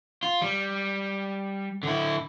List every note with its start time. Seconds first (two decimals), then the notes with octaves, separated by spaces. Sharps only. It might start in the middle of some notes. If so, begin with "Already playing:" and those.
0.23 F4
0.42 G3
1.83 D3 E4